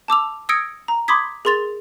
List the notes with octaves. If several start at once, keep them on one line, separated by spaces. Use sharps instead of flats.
A5 D6 E6 F7
D#6 E6 G#6 A#6 C#7 D7
A#5
B5 C6 D6 D#6 G#6 B6
G#4 A#4 C6 A6 F7